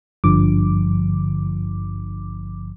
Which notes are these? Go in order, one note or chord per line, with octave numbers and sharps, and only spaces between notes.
G#1 G2 D3 F3 D6